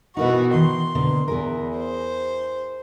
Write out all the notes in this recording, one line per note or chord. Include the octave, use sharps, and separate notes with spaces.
B2 E3 D#4 F#4 A#4 D#5
D#3 E3 C6
B2 D3 A#3
E2 E4 G#4 A#4
C5